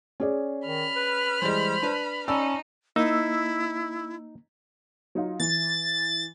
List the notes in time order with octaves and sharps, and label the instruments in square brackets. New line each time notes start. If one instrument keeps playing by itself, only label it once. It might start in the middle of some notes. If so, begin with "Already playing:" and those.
[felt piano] C#4 G#4 D5
[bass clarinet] D#3 [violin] B5 F6
[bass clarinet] B4
[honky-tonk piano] E3 G3 G#3 [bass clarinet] C5
[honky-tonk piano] D4 B4
[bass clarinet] C#4 [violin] D#4 [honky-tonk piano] D5 A5 B5 [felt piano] E6
[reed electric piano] A#3 [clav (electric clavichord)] D#4 [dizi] E4 [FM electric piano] E6
[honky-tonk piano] F#3 D#4 F4
[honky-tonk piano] E3 [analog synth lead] A6